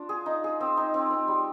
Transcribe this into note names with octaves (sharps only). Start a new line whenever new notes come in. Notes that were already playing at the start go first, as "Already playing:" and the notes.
Already playing: D4 F4
G#4
D#4
G#4
C4
D#4
C4
C4
G3